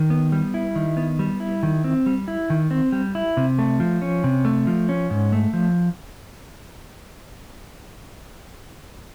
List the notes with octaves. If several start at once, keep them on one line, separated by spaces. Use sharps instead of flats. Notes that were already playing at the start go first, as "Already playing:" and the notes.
Already playing: D#3
B3
G3
E4
D#3
B3
G3
E4
D#3
C4
G3
E4
D#3
C4
G3
E4
C3
A3
F3
C#4
C3
A3
F3
C#4
G#2
A3
F3